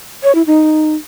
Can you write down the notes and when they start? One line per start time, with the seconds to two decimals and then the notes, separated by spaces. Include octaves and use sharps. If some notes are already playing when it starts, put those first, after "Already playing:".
0.23 C#5
0.35 E4
0.47 D#4